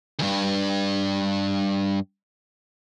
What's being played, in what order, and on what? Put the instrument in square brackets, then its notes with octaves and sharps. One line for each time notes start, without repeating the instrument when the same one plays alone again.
[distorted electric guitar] D2 G2